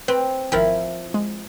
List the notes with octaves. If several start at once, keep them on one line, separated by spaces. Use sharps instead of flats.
C4 B4
G#1 F3 E4 A#4 G5
G#3